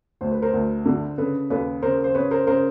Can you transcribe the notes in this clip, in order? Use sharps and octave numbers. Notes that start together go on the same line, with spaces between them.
D2 C5
B4
A#4 C5
D2
D3
C#3 A4 B4
D#2 A4 B4
C#3 A#4 C5
C5
C#3 B4 C#5
A#4 C5
C#3 A#4 C5